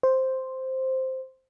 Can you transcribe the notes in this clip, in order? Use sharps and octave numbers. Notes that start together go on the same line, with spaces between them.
C5